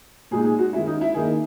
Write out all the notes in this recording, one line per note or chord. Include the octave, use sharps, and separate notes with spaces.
A#2 G#3 D#4 G#4
G#4
F#4
D#3 G#3 C#4 E4
D#4
E4
D#3 A#3 D#4 G#4